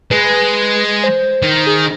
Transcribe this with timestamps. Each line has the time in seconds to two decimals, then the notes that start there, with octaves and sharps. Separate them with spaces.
0.11 G#3 B4
1.04 C5
1.42 D#3
1.67 G#4